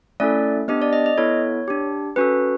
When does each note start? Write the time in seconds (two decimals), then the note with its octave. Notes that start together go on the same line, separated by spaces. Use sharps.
0.20 A3 C#4 E4 A4 D5
0.68 B3 D4 G4 D#5
0.82 D5
0.93 D#5
1.06 D#5
1.18 B3 E4 A4 C#5
1.68 D4 G4
2.16 C#4 F#4 A4 B4